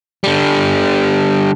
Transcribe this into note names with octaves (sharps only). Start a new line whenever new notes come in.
D3 G3